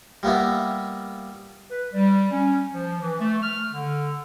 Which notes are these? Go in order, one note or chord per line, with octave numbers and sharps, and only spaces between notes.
G3 A#3 B3 E4
B4
G3
C#4
F3
E3
A3
F6
D3